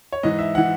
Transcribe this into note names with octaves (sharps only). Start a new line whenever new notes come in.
C#5
G#2 E3 D#5
E5
E3 F#5